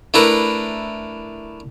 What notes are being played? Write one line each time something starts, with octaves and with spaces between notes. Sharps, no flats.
A3 D4 E4 A#4 B4